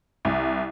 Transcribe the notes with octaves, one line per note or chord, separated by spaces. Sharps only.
C2